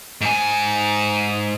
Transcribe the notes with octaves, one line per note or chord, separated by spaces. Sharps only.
G#2 G#5